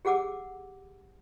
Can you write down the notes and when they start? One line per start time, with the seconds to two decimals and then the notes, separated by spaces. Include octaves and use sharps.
0.05 G4 G#4 F#5 D6 E6